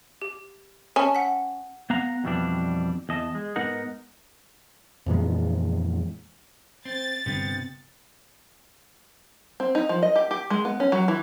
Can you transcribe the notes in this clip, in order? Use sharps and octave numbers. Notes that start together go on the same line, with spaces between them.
G4
C#4 A5
F#5 B6
B3 F5 F#5 A#5
F2 B2 E3 G3 D4
E2 D#5 A5
G#3
G#2 B3 D#4 A#4 F#5
F2 A#2 E3 G#3
C4 A6
G1 G2 C3 B3
C4
D#4
F3
D#5
G4
G4
G#3
B3
C#4
F#3
E3